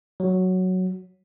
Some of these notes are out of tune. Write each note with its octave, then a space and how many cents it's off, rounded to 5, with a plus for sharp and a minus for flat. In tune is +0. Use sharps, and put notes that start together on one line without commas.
F#3 +0